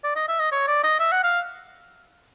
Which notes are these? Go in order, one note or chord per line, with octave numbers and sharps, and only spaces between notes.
D5
D#5
E5
D#5
C#5
D5
D#5
E5
F#5
F5